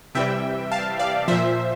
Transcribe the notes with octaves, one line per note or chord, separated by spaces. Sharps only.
C3 E3 G3 E5 G5
F5 A5
D5 F5
A#2 F3 C5 E5